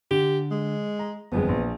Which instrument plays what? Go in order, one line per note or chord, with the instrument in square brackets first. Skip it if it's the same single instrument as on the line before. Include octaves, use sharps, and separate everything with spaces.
[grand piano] D3 [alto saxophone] G4
[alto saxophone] G#3
[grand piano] A#5
[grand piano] G1 F2 G#3 [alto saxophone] B3
[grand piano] A#1